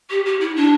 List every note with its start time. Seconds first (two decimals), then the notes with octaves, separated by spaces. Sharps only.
0.10 G4
0.25 G4
0.40 E4
0.56 D4